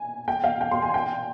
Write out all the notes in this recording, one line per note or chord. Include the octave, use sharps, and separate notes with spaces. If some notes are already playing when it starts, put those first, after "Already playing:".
Already playing: G#5
G5
F5
G5
C6
G#5
G5